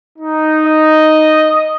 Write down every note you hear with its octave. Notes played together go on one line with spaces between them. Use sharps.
D#4
D#5